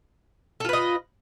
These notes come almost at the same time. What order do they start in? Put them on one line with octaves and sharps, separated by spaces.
A4 F4 B4 D#5